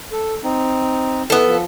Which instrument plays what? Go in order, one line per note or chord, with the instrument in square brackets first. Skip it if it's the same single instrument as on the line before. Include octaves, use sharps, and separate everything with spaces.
[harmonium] A4
C4 D#4
[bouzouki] B3 A4 [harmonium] E4
[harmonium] F3